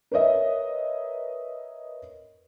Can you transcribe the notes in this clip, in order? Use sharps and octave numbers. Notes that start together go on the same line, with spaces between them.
A#4 B4 C#5 D#5 E5